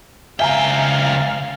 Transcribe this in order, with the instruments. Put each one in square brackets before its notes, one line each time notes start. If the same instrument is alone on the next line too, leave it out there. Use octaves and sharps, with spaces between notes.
[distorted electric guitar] C#2 G5 [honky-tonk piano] E5 G#5 A#5 [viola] F5